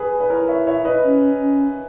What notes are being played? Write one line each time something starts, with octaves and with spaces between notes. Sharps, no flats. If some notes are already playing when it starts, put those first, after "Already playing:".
Already playing: G#4 B4
B4
E4 A#4 C#5
C#5 E5
C#5 E5
B4 D#5
C#4
C#4